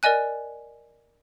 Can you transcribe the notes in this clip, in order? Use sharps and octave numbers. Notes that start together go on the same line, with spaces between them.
A#4 D5 D#5 G#5 F#6